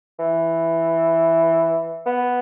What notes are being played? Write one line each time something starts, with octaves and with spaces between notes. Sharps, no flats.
E3
B3